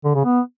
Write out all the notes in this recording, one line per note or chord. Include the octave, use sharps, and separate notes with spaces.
D3
C#3
B3